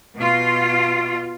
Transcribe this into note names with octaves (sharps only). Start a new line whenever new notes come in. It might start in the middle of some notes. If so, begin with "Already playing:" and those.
B2 F4